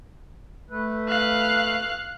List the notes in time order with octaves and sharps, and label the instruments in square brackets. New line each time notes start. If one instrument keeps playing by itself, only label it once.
[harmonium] A3 B4
[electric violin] F5 F#6